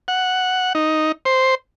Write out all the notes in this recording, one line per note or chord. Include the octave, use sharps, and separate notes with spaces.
F#5
D#4
C5